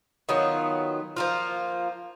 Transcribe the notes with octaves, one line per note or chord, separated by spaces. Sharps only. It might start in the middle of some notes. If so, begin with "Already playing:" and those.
D#3 F#3 B3 F4
F3 A#3 F4